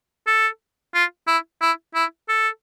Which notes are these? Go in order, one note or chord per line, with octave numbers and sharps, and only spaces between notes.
A4
F4
E4
E4
E4
A4